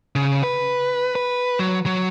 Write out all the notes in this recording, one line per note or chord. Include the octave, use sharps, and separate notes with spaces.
C#3
B4
B4
F#3
F#3